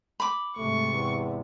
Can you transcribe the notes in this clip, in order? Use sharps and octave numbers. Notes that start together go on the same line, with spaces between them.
B5 D6
G#2 C3 A3 C#6
E2